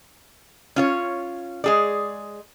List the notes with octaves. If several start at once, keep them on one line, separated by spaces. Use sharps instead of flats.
C#4 F4 C#5
G#3 G#4 D5